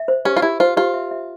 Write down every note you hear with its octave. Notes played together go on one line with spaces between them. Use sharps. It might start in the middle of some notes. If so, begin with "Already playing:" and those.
Already playing: E5
C5
C#4 G4
F4
E4 G4
F4 C5
F4 G4
E5
E5